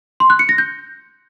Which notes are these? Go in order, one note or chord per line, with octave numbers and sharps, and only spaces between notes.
C6
F#6
C#7
A#6
G6